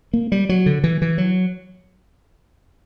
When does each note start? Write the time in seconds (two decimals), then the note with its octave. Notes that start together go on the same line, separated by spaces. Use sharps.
0.13 A#3
0.32 G3
0.49 F#3
0.66 D3
0.84 E3
1.02 E3
1.18 F#3